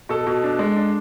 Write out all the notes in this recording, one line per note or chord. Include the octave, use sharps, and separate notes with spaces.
B2 A4
B2
D4
G#3
D4